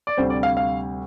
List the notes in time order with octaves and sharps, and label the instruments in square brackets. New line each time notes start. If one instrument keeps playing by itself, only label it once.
[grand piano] D5
D2 C3 G3 C5
D5
F5
F5